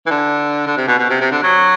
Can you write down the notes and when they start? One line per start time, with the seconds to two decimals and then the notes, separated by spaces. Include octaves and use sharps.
0.07 E3
0.11 D3
0.67 D3
0.77 C3
0.88 B2
0.99 B2
1.10 C3
1.21 C3
1.32 D3
1.43 F#3